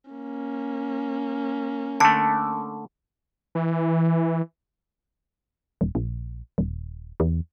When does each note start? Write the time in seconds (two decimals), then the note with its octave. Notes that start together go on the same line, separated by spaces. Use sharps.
0.11 A#3 C#4
2.00 D3 A3 A5
3.55 E3
5.81 D#1
5.95 A#1
6.58 D#1
7.20 E2